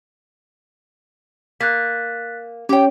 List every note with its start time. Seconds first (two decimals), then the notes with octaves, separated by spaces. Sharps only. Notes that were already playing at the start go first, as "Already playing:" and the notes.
1.61 A#3 F#6 A6 B6
2.69 C#4 G4 C#5 G5